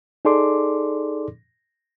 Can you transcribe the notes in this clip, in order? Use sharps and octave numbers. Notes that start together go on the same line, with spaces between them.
D#4 G#4 A4 D5 C6 D6